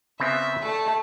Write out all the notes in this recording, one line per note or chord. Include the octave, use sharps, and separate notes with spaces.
C#3 B3 C4 E5
A3 D5 A5